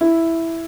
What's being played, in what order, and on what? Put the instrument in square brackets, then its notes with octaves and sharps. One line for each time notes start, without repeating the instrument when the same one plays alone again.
[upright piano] E4